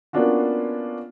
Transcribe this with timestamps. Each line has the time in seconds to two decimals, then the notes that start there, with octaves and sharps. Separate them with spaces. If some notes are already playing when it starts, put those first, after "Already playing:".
0.13 A#3 B3 C#4 D4 F4 F#4